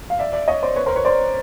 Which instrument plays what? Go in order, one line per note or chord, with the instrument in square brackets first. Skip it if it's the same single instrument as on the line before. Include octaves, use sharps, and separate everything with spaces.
[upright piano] F5
D5 E5
D5 E5
C#5 D#5
C5 D5
B4 C#5
A#4 C5
B4 C#5
C5 D5